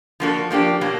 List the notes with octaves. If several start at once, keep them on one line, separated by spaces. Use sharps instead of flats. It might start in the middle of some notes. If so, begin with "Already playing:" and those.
F3 A#3 D4 F#4 A4
F3 A#3 D4 G4
B2 F#3 A#3